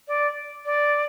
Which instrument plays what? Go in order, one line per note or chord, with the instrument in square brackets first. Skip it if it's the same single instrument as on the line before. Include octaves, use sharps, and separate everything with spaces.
[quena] D5
D5